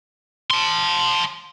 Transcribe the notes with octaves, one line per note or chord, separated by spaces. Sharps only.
A5 C6